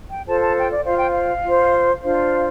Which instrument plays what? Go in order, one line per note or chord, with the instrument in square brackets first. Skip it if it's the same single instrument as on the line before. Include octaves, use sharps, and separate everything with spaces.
[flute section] G5
F4 A4 C5 A5
A5
G5
D5
F4 C5 F5
G5
F5
F4 C5
D4 F4 C5 F5